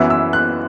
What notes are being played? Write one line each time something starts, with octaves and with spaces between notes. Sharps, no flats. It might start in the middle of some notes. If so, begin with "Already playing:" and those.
Already playing: F#2 E3 B3 E4 E6
E6
F#6